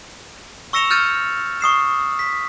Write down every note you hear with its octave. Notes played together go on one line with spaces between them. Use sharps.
C#6 E6 A#6 C#7 E7 F7
E6 F6 G6 A6 C#7 D#7
C#6 D#6 C7 E7
B6